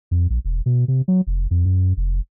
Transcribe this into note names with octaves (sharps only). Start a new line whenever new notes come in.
F2
A#1
E1
B2
C3
F#3
F1
F2
F#2
F1